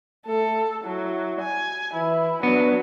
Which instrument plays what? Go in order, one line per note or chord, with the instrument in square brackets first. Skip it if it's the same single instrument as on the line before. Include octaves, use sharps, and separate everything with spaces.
[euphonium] A3 [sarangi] A4
[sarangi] F#3 [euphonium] E4
[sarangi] G#5
[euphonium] E3 [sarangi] E4
[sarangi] F#3 [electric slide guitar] B3 [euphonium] D4